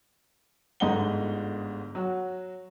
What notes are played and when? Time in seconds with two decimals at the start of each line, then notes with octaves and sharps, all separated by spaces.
0.80 G1 G#2 A3 D#5 F#5 G7
1.95 F#3 F#4